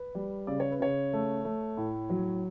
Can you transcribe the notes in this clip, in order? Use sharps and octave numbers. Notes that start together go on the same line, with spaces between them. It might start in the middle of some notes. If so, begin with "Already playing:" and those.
Already playing: B4
G3
C#3 D5
C#5
B4
C#3 C#5
A3
A3
A2
F#3